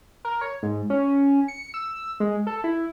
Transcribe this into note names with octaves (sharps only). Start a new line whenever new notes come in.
A#4
C#5
G#2
C#4
C#7
E6
G#3
A4
E4